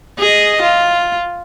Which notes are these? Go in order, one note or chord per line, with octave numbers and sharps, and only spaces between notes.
G#4 D#5
F4